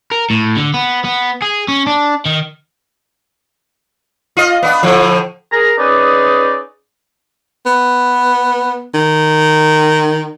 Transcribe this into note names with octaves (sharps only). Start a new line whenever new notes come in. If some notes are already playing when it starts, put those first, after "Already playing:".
A#4
A2
D3
B3
B3
G#4
C#4
D4
D#3
F4 D#5
B3 D4
A2 D3 F3
G#4 A#4 A#5
C#4 D#4 G#4 B4 D5
B3
D#3